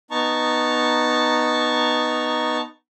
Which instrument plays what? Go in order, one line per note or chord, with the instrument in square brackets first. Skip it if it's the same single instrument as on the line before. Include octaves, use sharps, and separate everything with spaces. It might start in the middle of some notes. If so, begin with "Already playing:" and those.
[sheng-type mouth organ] B3 D#4 A5 A#5 C#6